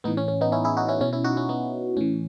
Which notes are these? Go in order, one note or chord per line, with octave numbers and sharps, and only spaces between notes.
A2 E3 B3 D#4
C#4
C#4
B3 D#4
C#4 E4
E4 G#4
D#4 F#4
C#4 E4
B2 C#4 E4
C#4 E4
D#4 F#4
C#4 E4
B3 D#4
A2 E3 C#4